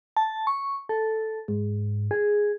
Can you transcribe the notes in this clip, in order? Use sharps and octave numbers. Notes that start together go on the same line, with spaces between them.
A5
C#6
A4
G#2
G#4